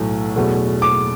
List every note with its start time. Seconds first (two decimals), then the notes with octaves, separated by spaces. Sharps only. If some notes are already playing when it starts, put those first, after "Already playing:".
Already playing: B1 A2 F#3 A3
0.36 E2 B2 F#3 A3
0.82 D6